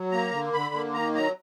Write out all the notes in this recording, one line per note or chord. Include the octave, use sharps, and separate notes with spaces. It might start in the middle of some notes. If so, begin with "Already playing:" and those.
Already playing: F#3
A#3 A#5
D3
D3 B5
A#3
D#3 A#5
F#3 A#5